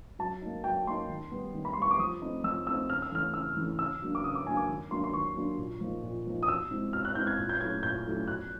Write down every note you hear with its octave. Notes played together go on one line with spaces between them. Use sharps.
F#3 A5
A#3 D#4
F#3 G5
A#3 D#4 C6
D#3
G3 B3
D#3
B5
C6
G3 B3 C#6
D6
F3 D#6
A3 C4 D#4
F3 E6
A3 C4 D#4 E6
C#3 F6
E6
E3 A3 C#4 F6
C#3 E6
E3 A3 C#4
C#3 E6
F#3 A#3 D4
D6
C#3 D#6
D6
F#3 A#3 D4 G#5
D6
D#3
F#3 A#3 D4 C6
C6
D#3 C#6
F#3 A#3 D4
A#2
F3 A#3 D#4
A#2
F3 A#3 D#4
D#6
B2 E6
G#3 C4 E4
B2 F6
F#6
G#3 C4 E4 G6
G#6
A#2
G6
F#3 A3 C#4 E4 G#6
A#2 G6
F#3 A3 C#4 E4
B2 F#6